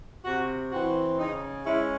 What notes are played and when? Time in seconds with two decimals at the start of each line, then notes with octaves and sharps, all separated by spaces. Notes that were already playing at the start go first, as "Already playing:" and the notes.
0.24 C3 F#4
0.72 E3 C4 F#4
1.18 C#3 D#4
1.66 G#3 C#4 E4